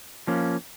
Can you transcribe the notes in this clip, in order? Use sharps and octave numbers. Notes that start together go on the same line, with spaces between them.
F3 A#3 C#4